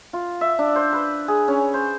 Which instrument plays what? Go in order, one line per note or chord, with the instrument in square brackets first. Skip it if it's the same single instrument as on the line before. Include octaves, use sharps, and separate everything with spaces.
[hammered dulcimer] F4
E5
D4
C5
B4
G#4
C#4
C5